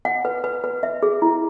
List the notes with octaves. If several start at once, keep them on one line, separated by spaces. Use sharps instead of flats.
F#5
B4
B4
B4
E5
G#4
E4